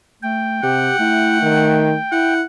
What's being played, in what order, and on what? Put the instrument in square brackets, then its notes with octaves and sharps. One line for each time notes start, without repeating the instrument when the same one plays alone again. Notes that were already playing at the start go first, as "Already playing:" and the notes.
[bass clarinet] A3 [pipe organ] G5
[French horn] C3 [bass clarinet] G4 [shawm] F#5
[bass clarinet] A3 [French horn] E4
[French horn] D#3
[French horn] E4 [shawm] F#5